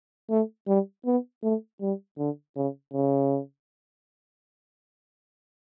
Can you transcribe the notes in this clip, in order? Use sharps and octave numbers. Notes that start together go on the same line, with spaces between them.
A3
G3
B3
A3
G3
D3
C#3
C#3